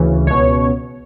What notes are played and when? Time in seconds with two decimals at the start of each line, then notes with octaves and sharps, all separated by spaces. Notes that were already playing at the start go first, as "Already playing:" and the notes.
Already playing: D2 C#3 E3
0.27 C#2 B2 C#5